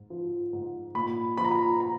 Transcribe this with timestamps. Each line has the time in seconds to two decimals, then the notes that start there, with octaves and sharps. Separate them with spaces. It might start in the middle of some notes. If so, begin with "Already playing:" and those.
Already playing: G#2
0.10 F3
0.53 G#2
0.95 A#2 B5
1.37 F3 B5
1.45 A#5
1.51 B5
1.80 A#5